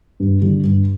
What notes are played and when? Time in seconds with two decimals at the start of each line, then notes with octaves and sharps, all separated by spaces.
0.20 G2
0.42 D3 G3
0.64 G2